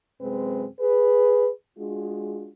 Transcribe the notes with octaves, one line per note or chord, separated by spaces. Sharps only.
F#2 C3 G#3 C4 B4
G#4 B4
G#3 D4 F4 F#4 G#4